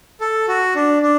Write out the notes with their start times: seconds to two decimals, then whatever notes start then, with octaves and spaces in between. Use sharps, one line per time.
0.21 A4
0.48 F#4
0.75 D4
1.02 D4